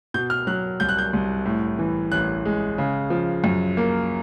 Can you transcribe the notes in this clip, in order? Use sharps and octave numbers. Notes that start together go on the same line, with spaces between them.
B2 G6
F6
F#3 F#6
C2 G6
F#6
G6
C2
A2
E3
A1 F#6
G#3
C#3
F3
F#2
A#3